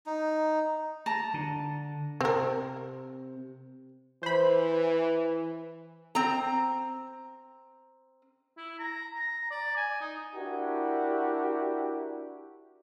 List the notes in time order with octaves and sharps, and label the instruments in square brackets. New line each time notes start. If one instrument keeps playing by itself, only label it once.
[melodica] D#4
[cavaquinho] A5 A#5
[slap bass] D3
[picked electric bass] C3 [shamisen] C4 A#4
[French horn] E3 [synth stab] C5 B5
[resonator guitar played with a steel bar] C4 A#5
[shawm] E4
A#5
A#5
D5
G#5
D#4
[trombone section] D4 E4 F#4 G4 A#4